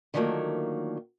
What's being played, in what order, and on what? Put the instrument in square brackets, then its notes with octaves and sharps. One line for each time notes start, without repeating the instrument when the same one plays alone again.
[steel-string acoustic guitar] D3 D#3 F3 F#3 A3 A#3